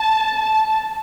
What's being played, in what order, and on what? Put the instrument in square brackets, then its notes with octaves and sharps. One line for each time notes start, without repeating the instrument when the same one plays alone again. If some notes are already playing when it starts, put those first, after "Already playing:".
Already playing: [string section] A5
A5